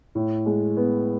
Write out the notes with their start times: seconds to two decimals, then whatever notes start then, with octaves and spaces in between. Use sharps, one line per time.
0.15 A2
0.46 G#3
0.77 B3